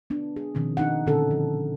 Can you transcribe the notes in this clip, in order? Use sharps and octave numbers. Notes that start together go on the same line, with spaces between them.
B3 D4
G#4
B2 D#3 F3 C4
D4 D#4 F#5
A#2 D3 C4 C#4 A4
F3